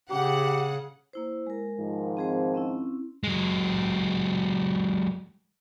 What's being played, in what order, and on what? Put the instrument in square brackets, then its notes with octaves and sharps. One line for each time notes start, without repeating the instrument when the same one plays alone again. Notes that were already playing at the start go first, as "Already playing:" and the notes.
[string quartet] C#3 [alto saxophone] G4 [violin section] F#5
[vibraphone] A#3 E4 C5
G#3 A#4
[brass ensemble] G#2 D#3 F3
[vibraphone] C4 G#4 C5
C4 C#4 E4
[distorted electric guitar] F#3 G#3